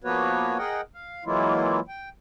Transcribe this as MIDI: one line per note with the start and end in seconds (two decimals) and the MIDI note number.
0.04 0.58 53
0.04 0.58 58
0.04 0.58 59
0.04 0.58 66
0.04 0.58 71
0.04 0.58 73
0.58 0.81 68
0.58 0.81 70
0.58 0.81 75
0.58 0.81 78
0.58 0.81 79
0.94 1.24 77
1.25 1.80 52
1.25 1.80 54
1.25 1.80 56
1.25 1.80 58
1.25 1.80 64
1.25 1.80 65
1.88 2.09 79